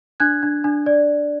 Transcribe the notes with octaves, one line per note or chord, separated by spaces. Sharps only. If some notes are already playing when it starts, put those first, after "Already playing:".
D4 F#6 G#6
D4
D4
D5